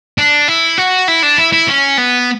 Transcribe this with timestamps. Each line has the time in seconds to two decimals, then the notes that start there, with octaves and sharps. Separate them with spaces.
0.18 D4
0.48 E4
0.78 F#4
1.08 E4
1.23 D4
1.38 E4
1.53 E4
1.68 C#4
1.98 B3